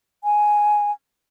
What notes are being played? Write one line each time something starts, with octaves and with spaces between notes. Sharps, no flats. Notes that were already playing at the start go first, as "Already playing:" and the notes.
G#5